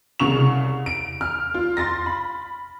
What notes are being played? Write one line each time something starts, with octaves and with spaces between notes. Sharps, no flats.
C2 C#3 C#6 F7
D7
F6
F4
C6 A6 A#6
B5